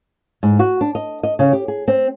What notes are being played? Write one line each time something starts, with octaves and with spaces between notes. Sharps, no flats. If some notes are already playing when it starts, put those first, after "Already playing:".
G#2
F#4
D4
D#5
D#5
C#3
G4
G#4
C4